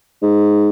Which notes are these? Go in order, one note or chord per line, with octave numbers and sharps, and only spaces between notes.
G#2